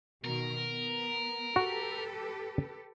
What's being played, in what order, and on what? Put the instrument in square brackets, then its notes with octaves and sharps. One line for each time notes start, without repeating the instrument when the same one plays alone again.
[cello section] B2 D#3 [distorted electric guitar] A#4
[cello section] B3
[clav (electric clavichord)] F#4 [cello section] G4 A4 B4